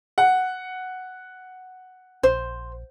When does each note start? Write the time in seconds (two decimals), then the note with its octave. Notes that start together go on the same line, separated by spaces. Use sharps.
0.18 F#5
2.23 A#1 C5